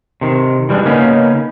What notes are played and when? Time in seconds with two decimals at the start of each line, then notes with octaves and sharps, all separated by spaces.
0.21 C3 D#3
0.69 E3 G3 G#3 D4
0.85 C#3 A#3 B3 C#4 D#4